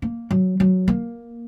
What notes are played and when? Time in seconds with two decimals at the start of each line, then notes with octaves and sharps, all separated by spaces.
0.02 A#3
0.31 F#3
0.60 F#3
0.88 A#3